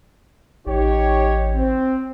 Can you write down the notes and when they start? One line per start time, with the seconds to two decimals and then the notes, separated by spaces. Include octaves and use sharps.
0.67 A1 D#4 G4 C#5
1.55 C4